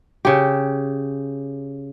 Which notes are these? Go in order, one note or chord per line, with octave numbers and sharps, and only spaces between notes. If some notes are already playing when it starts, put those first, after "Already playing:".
C#3 G4